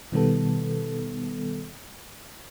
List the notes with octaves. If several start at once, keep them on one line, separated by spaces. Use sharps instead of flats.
B2 D#3 G3 B3 A4